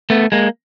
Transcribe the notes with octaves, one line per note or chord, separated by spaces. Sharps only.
A3 B3
G#3 A#3